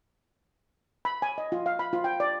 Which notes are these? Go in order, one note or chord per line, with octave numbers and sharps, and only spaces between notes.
B5
G#5
D#5
F4
F5
B5
F4
G5
D5